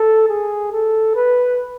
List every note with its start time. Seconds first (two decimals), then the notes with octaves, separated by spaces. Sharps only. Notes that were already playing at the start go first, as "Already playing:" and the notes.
Already playing: A4
0.29 G#4
0.72 A4
1.15 B4